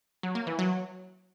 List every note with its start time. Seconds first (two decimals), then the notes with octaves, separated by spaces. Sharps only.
0.23 F#3
0.35 A#3
0.47 E3
0.59 F#3